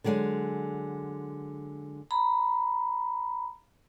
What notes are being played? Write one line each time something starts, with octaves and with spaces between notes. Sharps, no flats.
D3 F#3 G#3 F#5 G#5
A#5 B5